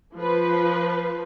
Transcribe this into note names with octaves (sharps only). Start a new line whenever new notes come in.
F3 B4